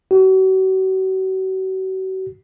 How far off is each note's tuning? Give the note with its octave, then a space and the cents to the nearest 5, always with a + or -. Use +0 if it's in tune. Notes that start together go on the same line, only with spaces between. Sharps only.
F#4 +40